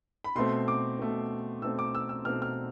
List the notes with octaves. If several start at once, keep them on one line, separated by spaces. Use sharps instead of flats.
B5
B2 A3 C4 C6
D6
B2 A3 C4
B2 A3 C4 E6
D6
E6
E6
B2 A3 C4 F6
F6